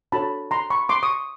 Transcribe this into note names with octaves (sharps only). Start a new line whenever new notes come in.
D4 F#4 A4 C#5 A5 B5
A#5 C6
B5 C#6
C6 D6
C#6 D#6